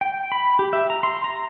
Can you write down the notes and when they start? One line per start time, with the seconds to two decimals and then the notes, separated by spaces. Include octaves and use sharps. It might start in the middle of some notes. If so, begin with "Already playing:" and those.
0.01 G5
0.32 B5
0.59 G4
0.73 E5
0.90 A#5
1.03 C6
1.24 A#5